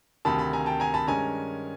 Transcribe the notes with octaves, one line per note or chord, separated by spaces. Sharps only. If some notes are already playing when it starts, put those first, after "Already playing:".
D2 C3 D#3 A5 B5
A5 B5
G#5 A#5
G5 A5
G#5 A#5
A5 B5
G2 D#3 G#3 C#4 G#5 A#5